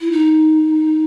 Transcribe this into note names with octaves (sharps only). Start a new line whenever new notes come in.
E4
D#4